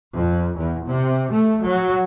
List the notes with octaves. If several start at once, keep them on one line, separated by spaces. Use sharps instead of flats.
F2
E2
C3
A3
F#3